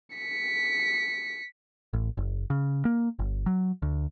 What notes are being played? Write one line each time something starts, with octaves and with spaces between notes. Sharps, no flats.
B6 C#7
A1
F#1
C#3
A#3
G1
F#3
D2